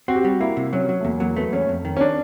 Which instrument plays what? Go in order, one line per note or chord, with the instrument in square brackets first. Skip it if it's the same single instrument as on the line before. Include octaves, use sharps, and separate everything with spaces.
[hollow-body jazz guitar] C4 [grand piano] F#4
[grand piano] G4
[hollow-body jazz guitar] G3 [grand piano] F#4
[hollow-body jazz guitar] A#3 [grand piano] E4
[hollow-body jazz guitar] C3
[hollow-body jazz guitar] F#3 [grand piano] C#4
[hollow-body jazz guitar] F#3
[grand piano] A3
[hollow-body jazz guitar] E2 [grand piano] A#3
[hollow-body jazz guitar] F#3 [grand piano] A#3
[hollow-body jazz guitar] A3 [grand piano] B3
[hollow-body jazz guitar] E2 [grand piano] C#4
[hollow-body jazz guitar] F2
D#3
[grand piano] C#4
D4